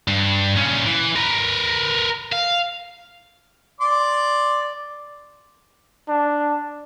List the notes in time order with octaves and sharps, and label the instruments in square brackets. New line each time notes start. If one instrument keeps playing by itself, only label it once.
[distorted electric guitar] G2
A#2 C#4
E3
A#4 B4
F5
[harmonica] D5 C6 D6
[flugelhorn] D4